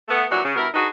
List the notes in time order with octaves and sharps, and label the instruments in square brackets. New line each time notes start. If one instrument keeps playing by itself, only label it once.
[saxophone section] A3 B3
A#2 E3 F#3 G3 D4 F#4
C#3
G2 B2 E4 A#4
D4 D#4 F#4 G#4 B4